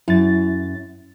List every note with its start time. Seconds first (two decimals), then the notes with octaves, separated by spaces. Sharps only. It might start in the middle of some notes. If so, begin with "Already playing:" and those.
0.08 F#2 E4 A6